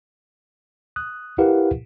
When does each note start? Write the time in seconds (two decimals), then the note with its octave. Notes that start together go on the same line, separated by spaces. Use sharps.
0.96 D#6 F#6
1.38 E4 G4 A#4 B4 F5 F#5